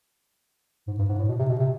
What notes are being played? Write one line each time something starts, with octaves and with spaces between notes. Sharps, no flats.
G#2
G2
G#2
A2
B2
C3
B2
C3